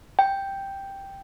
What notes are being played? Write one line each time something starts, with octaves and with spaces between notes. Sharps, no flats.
G5